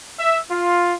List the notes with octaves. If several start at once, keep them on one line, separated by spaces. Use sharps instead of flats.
E5
F4